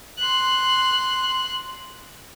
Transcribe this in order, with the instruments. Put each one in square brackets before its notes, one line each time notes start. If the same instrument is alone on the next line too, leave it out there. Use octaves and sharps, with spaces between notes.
[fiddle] C6 F#6